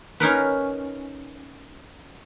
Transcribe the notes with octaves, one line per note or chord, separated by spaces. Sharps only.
C#4 D#4 A#4 B4